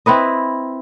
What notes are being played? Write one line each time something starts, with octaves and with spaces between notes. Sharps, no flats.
C4 E4 B4 D#5